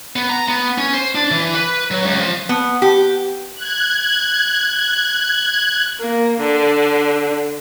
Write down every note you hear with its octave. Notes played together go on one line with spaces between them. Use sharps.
B3
A#5
B3
C#4
C5
D4
E3
B4
F#3
C#2
F3
B3
G4
F#6 G#6
A#3
D3